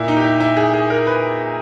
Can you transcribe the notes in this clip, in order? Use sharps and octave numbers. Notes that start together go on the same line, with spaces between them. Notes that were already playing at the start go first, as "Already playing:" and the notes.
Already playing: A#2 E4
D#4
G4
E4
E4
G#4
G#4
A#4
B4